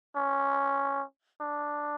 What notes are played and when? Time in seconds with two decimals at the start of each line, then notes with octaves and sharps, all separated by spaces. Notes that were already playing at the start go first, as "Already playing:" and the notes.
0.16 C#4
1.41 D4